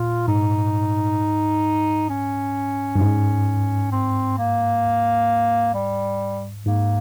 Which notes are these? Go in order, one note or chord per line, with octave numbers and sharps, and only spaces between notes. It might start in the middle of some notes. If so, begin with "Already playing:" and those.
Already playing: A#2 F4
G#2 D#4
C#4
G2
G#2
C4
A#3
G3
G#2 A#3